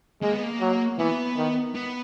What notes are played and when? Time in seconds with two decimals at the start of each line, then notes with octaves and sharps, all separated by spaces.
0.22 G#3 A#3
0.33 B3
0.43 A#3
0.61 F#3
0.98 E3 B3
1.37 D#3
1.75 B3